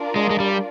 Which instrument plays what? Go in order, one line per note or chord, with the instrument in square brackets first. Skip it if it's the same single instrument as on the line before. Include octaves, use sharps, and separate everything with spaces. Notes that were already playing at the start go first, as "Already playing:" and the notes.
Already playing: [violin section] D4 F4 A#4 D5
[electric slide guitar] G#3
G#3
G3